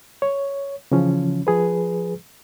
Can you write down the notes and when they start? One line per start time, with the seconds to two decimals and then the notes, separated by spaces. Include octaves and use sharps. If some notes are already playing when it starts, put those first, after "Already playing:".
0.22 C#5
0.92 C#3 E3 F3 C#4
1.47 F3 G#4 B4